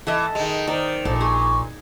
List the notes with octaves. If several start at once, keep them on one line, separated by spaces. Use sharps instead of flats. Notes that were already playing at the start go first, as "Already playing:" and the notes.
E3 A4 D#5 E5
D#3 G#3
D#3 A#4 C5 D5
A#1 A#2 A4
G#4 C#6